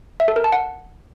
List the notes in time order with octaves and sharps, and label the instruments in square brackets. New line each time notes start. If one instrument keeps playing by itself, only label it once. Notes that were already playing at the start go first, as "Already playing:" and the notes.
[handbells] E5
A4
A#4
A5
F#5